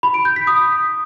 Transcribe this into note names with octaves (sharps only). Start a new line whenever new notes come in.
B5
D7
G6
B6
D#6